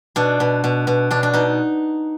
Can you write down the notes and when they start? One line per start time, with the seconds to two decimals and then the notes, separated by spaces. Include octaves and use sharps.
0.16 B2 D4
0.40 B2
0.64 B2
0.87 B2
1.11 B2 D4
1.23 D4
1.34 B2 D#4